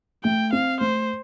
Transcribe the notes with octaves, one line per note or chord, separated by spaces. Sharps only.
A3 G5
C4 F5
A3 C5